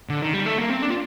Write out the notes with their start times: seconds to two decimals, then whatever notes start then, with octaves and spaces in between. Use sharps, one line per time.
0.09 D3
0.22 D#3
0.34 G3
0.46 A3
0.58 A#3
0.70 C4
0.82 D4
0.90 F4